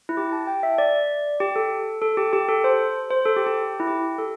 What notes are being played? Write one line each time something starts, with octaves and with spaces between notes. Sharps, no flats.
E4
G4
A5
G5
E5
D5
G4
A4
A4
G4
G4
A4
C5
C5
A4
G4
G4
E4
G4
A4